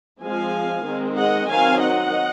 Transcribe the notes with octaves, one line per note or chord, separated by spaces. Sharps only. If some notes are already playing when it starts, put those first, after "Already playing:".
F3 G#3 C4 F5 G#5
D#3 G#3 C4
D#5 F#5
D#3 F#3 C4 F5 G#5
D#5 F#5